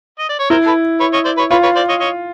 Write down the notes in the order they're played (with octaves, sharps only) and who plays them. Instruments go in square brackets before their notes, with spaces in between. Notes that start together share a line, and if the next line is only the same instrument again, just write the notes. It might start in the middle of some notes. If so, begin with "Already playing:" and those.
[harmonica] D#5
D5
C#5
[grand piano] E4 [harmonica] A#4 C5
[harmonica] A4 B4
B4 C#5
C#5 D#5
C5 D5
B4 C#5
[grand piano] F4 [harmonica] B4 C#5
[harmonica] B4 C#5
C5 D5
C#5 D#5
C#5 D#5